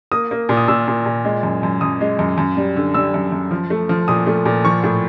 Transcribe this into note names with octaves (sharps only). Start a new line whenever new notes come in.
A#3 D#6
A#3
A#2
D#6
A#2 E6
A#2
A#2
G#3
F#2
F#2
F#2 D#6
G#3
F#2
F#2
G3
D3
G3 E6
F#2
F#2
F3
A3
F3
A#2 D#6
A3
A#2
F3 C#6
A2